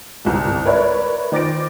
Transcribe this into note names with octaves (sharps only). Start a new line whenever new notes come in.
G1 C2 G#2
A#4 B4 C#5 D5 E5
D#3 C5 D6 A6 A#6 D7